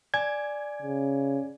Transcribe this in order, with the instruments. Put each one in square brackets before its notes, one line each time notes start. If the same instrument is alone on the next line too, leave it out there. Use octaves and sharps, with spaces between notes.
[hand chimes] D5 G#5 [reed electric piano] G#6
[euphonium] C#3